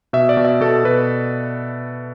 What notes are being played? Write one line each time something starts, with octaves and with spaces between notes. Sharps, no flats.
B2 E5
D5
B2
E5
B2 A4
B2 B4